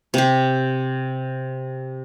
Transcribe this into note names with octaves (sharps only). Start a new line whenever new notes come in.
C3 G4